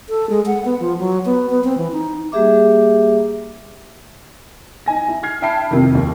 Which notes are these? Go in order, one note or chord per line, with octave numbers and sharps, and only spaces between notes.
A4
G#3
F#5
B3
F3
F#3
B3
B3
C4
E3
D#4
G3 A#3 G4 G#4 E5 D6
D#4 G#5 A#6
E4
F6 G#6 C7
E5 G5 A5 B5 C7
F2 C3 D#3
D#2